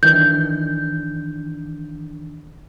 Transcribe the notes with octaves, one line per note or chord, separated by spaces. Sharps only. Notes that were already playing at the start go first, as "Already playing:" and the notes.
D#3 E3 D4 G6